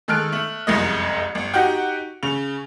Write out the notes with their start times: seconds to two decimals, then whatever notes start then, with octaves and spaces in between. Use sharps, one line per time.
0.08 D#3 G#3 A4 F6 F#6 D7
0.32 A3 F#7
0.67 F#1 C2 F2 G#3 D#5
1.35 G1
1.54 D#4 F#4 G4 F#5 G5
2.23 C#3 F7